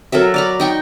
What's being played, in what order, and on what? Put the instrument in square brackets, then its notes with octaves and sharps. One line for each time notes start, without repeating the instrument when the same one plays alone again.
[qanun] F#3 A4 A#4 E5
D5 A#5 B5
D#4 G5 C#6